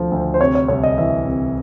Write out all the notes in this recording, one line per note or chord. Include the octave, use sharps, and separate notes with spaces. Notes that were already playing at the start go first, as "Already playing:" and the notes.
Already playing: D2 D3 F3
D2
C5
C3 C#5
C#5
C2 C#5
D#5
E3 E5
C2